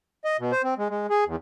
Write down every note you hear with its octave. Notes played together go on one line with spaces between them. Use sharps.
D#5
B2
C5
C4
G#3
G#3
G#4
E2